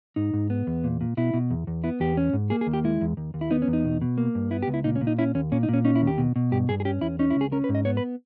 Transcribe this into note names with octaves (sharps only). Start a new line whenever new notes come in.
G#2 D#4
G#2
B3
E2
A#2
A#2
B2 E4
B2
E2
E2
B3 E4
E2 G4
C#4
G#2
A#3 G#4
G#4
D#2
G4
G#3 E4
E2
D#2
D#2
E4
B3 D#4
C#4
E2
D#4
B2
B2
A#3
G2
B3 E4
G4
C#2
E4
A#2 D#4
C#4
A#2
D#4
C#4 E4
D#2 C#4
A#2 C#4
D#4
A#2 C#4
C#4 D#4
E4
D#2
G4
B2
B2
G2 G4
G2 G#4
G#4
C#4 G4
E2 E4
C#4 D#4
E4
C#2
G#4
C#4 A#4
B4
G#2
D#5
B3 C#5
B4